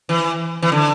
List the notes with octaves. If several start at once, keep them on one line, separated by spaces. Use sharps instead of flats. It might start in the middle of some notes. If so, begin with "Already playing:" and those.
E3
E3
D3